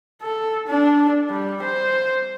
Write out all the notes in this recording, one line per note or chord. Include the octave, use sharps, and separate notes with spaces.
A4
D4
G3
C5